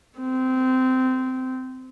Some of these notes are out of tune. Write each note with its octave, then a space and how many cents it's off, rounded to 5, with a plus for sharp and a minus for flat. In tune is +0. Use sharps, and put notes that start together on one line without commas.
C4 -20